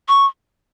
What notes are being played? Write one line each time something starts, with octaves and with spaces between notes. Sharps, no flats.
C#6